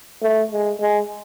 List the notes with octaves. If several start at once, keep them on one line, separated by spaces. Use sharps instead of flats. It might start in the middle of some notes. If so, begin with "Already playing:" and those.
A3
G#3
G#3